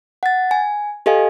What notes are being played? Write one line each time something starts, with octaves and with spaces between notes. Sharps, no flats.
F#5 A6
G#5
G4 A4 D#5 F5 G#5